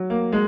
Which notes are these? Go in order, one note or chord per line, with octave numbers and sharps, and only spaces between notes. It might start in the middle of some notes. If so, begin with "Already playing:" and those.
Already playing: F#3
A#3
G#3